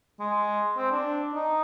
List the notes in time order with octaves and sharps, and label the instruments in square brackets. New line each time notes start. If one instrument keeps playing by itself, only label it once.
[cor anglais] G#3
C4
D4
D#4